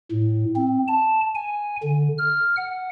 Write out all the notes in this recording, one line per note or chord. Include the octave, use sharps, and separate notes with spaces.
A2
C4
A5
G#5
D3
F6
F#5